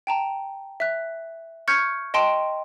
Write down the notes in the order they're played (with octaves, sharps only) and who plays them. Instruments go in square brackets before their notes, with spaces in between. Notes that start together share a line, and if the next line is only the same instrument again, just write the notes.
[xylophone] G5 A5 A#5
E5 F#6
C#6 F6 G6 G#6 C#7
D#5 G5 A5 C6 D7